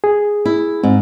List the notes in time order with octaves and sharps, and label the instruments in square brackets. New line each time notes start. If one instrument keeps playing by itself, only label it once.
[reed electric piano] G#4
[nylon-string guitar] E4
[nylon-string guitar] G#2 [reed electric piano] C4